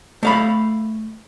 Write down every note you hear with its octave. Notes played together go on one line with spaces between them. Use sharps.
A3 F5 B5